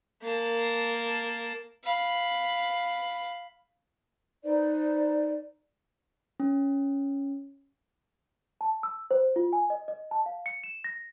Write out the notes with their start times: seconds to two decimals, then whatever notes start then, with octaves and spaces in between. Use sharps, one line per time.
0.23 A#3 A5
1.84 F5 B5
4.44 D#4 B4 C5 D5
6.40 C#4
8.61 A5
8.83 E6
9.11 C5
9.36 F4
9.53 G#5
9.70 D#5
9.88 D#5
10.11 A5
10.26 F5
10.46 C#7
10.64 E7
10.84 A#6